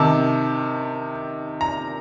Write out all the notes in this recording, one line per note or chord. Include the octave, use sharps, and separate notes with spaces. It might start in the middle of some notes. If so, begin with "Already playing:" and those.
Already playing: C3 D#3 A5
A#5